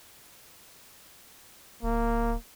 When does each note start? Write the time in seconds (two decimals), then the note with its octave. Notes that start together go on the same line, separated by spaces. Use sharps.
1.83 D1 A#3